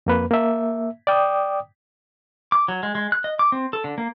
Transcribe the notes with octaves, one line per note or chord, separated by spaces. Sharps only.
F2 A#3 B4
A#3 E5
D5 G5 D6 D#6
D6
F#3
G#3
G#3
F#6
D#5
D6
C4
A4
D3
A#3